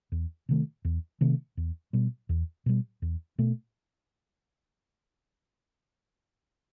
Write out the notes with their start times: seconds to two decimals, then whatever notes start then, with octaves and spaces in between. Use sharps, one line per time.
0.12 E2
0.49 C3 D#3 A3
0.85 E2
1.21 C3 D#3 A3
1.57 E2
1.93 B2 G3
2.29 E2
2.66 B2 G3
3.02 E2
3.38 B2 A3